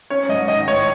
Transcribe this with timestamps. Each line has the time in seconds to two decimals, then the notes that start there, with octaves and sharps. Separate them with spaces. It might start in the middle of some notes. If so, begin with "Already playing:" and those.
0.10 C#4 C#5
0.29 G#2 D#5
0.48 D#3 D#5
0.67 A2 C#5